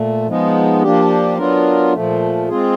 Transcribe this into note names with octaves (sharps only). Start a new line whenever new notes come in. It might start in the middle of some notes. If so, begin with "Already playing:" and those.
Already playing: A#2 A3
F3 G#3 B3 D#4
F3 A#3 D4 G4
F#3 B3 D4 F4 A#4
A#2 F3 A3
G#3 C4 F4 G#4